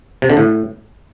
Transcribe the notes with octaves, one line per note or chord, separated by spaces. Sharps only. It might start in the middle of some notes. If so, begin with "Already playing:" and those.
C3
D3
A2